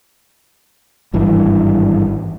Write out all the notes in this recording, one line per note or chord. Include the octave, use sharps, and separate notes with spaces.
G#1 G2 E3